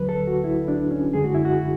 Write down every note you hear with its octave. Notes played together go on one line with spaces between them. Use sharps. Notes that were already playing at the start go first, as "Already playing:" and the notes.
Already playing: D2 D3 F#3 B4
A4
F#4
E4
D4
C#4
F#2 D3 G#3 G#4
F#4
E4
F#4